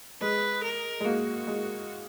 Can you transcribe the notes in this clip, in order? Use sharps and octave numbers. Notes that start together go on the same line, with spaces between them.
G#3 B4
A#4
G#3
A#3 F#4
G#3